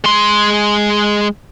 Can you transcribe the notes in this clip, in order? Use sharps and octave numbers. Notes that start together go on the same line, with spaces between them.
G#3 C6